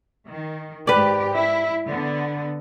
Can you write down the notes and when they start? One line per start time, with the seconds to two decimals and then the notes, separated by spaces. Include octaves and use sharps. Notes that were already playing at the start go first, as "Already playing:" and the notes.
0.30 D#3
0.87 G#2 G4 B4 D5
1.36 E4
1.87 D3 B3